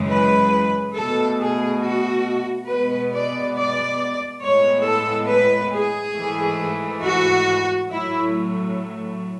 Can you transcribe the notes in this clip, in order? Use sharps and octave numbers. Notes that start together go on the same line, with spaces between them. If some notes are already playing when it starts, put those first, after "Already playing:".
Already playing: F#2 C#3 E3 G#3
B4
B2 A3 A4
G#4
F#4
B2 G#3 B3 B4
D5
D5
A2 G#3 B3 C#5
A4
B4
G#4
G#2 E3 A3
F#4
A2 F#3 A3 E4